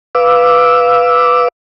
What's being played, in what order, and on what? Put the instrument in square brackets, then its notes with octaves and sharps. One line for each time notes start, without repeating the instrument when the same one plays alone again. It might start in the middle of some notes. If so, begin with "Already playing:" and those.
[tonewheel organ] B4 F5 D6 E6